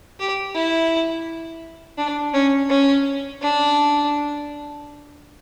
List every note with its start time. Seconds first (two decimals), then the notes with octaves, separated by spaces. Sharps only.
0.20 G4
0.55 E4
1.98 D4
2.34 C#4
2.70 C#4
3.42 D4